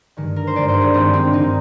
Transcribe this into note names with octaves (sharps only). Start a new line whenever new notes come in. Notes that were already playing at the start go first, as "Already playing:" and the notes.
G2 D#3 G#3
A#4
C5
G2 D#3 G#3 D5
C5
G#4
G2 D#3 G#3 C4
C4
G2 D#3 G#3 D#4